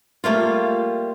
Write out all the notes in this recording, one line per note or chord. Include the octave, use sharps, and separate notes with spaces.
G3 A3 A#3 F4